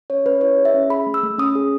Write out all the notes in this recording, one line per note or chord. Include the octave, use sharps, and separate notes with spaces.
C#4 C#5
C#4 B4
E4 C#5
G#4
E5
C#4
G#4 B5
A3
E6
A3
C#4 D#6
G#4